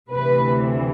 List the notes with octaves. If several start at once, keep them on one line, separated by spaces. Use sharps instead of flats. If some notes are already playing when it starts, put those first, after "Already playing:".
D2 C3 E3 B4